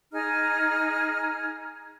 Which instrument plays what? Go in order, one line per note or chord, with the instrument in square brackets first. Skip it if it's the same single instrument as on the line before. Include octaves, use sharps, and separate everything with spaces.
[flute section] D#4 G#4 A#5 F6